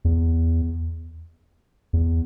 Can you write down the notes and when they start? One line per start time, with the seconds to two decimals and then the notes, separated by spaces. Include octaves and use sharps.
0.05 E2
1.93 E2